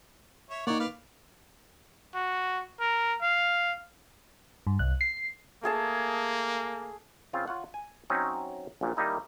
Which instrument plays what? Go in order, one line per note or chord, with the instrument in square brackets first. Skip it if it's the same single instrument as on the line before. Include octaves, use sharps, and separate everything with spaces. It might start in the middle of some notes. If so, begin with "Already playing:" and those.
[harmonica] C#5 E5
[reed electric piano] A#3 D#4 [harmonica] C#5 D5 F#5
[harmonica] B4 F5 D6
[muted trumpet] F#4
A#4
F5
[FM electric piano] G2
C2 F#6
C7
[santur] A3 G#4 A5 [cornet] A#3
[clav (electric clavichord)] C#3 C4 F4 F5
F4 C#5 F#5
G#5
F#3 C4 C#4 D#4 D#5 E5
A#1 F#2 A#2
D#3 G3 A#3 D#4 E4